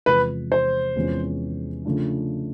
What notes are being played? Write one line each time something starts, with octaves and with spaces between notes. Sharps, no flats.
E2 C3 F3 G#3 B4
C5
E2 C3 F3 G#3 C#4
C#3 F3 A3 D4 F4